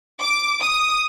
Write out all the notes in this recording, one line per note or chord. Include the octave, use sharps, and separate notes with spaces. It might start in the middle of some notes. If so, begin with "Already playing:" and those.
D6
D#6